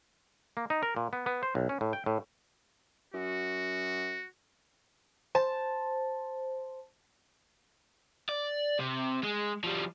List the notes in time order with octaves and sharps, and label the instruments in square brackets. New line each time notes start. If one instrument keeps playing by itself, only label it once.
[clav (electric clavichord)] A#3
D#4
A#4
A#2
B3
B3
C5
B1
C#4
A2
G5
A2
[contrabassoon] F#2 [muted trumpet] F#4
[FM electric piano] C5 [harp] A5
[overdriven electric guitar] D5
C3
G#3
F3 G3